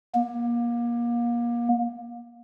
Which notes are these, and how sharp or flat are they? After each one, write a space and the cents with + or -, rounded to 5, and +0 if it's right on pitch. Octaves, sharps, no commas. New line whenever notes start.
A#3 +30